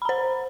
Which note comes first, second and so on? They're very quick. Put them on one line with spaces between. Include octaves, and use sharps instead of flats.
B5 A#5 C5